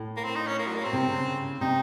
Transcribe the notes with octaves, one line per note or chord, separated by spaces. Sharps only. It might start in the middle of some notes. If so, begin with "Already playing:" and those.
Already playing: A2
A#3
C4
D#4
C#4
A#3
F#3
A#3
C4
C3
C#3
C3 D#4